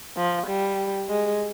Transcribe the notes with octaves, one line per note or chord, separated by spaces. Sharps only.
F3
G3
G#3